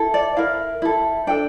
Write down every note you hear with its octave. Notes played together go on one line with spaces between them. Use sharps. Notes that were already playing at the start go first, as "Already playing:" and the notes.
Already playing: E4 A4
D5
E4 A#4 F5
E4 A4
D4 A4 G5